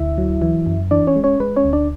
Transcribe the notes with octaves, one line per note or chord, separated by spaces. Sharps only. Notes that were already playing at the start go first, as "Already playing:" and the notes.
Already playing: D2 E4 E5
F#3
E3
F#2
E3 D4 D5
C#4 C#5
G#3
C#4 C#5
G#3 B4
C#4 C#5
D2
D4 D5